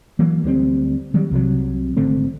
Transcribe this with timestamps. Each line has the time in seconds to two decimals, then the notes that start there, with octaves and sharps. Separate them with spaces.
0.19 E3 F#3 A#3
0.44 D2 G3 B3 C4
1.14 D#3 F#3 G3
1.31 C2 C3 F3 F#3
1.97 G#1 D3 A3 C4